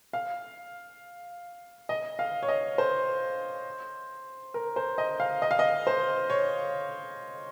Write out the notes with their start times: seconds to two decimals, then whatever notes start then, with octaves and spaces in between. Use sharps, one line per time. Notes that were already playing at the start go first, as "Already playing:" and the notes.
0.13 F5
1.89 D#5
2.19 F5
2.43 C#5
2.48 D#5
2.78 C5
4.54 A#4
4.76 C5
4.98 D#5
5.20 F5
5.42 D#5
5.51 F5
5.59 D#5
5.87 C5
6.30 C#5